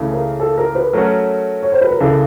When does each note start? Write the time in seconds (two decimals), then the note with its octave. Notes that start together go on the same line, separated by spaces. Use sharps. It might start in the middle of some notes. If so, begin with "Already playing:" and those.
Already playing: C#2 C#3 E3 A3
0.13 A#4
0.40 A4
0.58 A#4
0.75 B4
0.93 F#3 A3 C#4 F#4 A#4
1.63 C#5
1.72 C5
1.81 B4
1.91 A#4
2.00 C#2 C#3 E3 A4